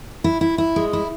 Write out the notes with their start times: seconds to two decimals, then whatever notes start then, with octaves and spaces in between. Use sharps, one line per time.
0.24 E4
0.41 E4
0.58 E4
0.76 G#3
0.93 E4